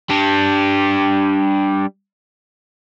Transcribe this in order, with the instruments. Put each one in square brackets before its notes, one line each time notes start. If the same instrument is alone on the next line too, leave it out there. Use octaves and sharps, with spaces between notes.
[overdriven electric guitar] G3 D4